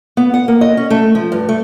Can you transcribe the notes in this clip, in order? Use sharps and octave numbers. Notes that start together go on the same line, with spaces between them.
B3
F#5
A#3
D#5
C#4
A3
F3
G2
A3